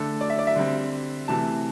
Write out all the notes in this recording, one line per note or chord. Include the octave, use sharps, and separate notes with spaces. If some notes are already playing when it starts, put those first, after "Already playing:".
Already playing: D3 A3 D4 A4
D5
E5
D5
E5
D3 G3 C4
C3 E3 A3 A5